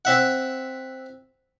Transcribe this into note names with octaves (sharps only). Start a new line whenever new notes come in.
C4 E5 F#5